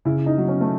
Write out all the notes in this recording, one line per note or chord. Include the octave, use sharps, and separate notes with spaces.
C#3 E4
D#4
F#3
C#4
A3